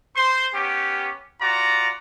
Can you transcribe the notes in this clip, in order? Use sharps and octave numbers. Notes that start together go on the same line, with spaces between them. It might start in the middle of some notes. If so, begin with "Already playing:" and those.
C5 C6
B3 C#4 G4
F4 F#4 D5 A#5